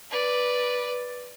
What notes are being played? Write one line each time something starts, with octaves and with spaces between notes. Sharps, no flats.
B4 D5